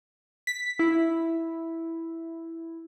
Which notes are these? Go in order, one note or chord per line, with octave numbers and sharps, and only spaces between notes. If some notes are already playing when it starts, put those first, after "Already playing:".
B6
E4